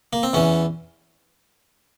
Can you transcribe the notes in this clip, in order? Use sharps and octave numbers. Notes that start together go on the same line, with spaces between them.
A#3
C4
E2 E3 C#4